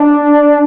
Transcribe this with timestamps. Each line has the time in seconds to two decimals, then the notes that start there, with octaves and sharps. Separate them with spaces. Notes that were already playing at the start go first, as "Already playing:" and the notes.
Already playing: D4